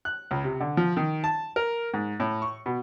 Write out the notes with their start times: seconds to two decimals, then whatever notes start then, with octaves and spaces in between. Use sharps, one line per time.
0.05 F#6
0.31 C#2
0.44 C3
0.60 D3
0.77 F3
0.97 D#3
1.24 A5
1.56 A#4
1.94 G#2
2.20 A2
2.42 C#6
2.66 B2